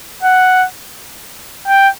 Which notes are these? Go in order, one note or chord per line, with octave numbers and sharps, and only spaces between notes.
F#5
G5